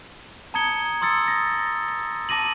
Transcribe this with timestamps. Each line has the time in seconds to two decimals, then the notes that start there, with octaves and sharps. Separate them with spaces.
0.54 A5 A#5 D#6 G#6 C#7 G7
1.02 C6 D#6 E6 A6 C#7
1.28 A#6
2.29 A5 D6 A#6 D#7 F#7